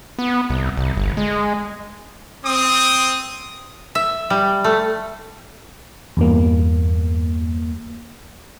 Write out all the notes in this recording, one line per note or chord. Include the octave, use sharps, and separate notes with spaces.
B3
C2
C2
G1
G#3
C4 D#6
E5
G3
A3
E2 G2 A#3